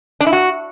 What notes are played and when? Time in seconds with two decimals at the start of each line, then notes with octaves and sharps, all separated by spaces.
0.21 D4
0.27 E4
0.33 F#4